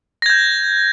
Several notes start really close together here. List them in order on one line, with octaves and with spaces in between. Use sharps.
A#6 G#6 G6